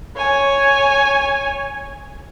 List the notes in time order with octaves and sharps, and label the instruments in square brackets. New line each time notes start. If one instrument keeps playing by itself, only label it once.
[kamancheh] C#5 G#5